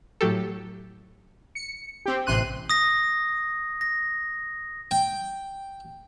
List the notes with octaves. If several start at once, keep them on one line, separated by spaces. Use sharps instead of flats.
A2 F#3 G4 A4
C#7
C4 G4
A1 C3 C6 F#6 D#7
D#6 A#6
A#6
G5